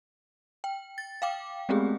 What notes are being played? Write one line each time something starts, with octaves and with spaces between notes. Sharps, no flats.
G5
A6
F5 G5 D6
G#3 A3 B3 C4 G4 G#4